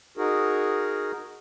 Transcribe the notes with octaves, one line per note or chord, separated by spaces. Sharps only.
D#4 F#4 G#4 A#4